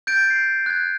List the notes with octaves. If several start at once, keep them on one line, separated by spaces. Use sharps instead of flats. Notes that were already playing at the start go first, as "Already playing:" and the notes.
G6 A6 D7
C7
F#6 G#6